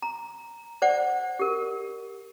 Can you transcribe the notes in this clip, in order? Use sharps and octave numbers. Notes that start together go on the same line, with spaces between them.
A#5
C5 D5 F#5
G4 A#4